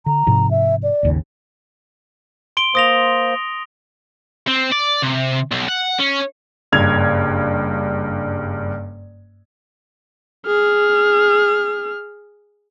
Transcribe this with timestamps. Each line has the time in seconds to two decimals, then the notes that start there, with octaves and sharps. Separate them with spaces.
0.06 D3 A#5
0.27 G#2 C3 F3
0.51 E5
0.83 D5
1.03 G#1 D#2 C#3
2.57 C6 D7 G7
2.75 A#3 C5 D#6 A#6 F7
4.48 C4
4.72 D5
5.03 C3
5.51 B1
5.68 F#5
5.99 C#4
6.72 F#1 G2 G#6 F7
10.47 G#4 F6